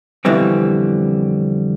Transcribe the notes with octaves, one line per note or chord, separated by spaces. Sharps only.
F2 B2 D3 E3 G3 C4